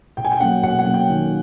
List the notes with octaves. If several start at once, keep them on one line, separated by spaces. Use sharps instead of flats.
B2 G5
G#5
G5
F#3 A#3 C#4 F#5
B2 F#5
F#5
F#3 A#3 C#4
G5
D#3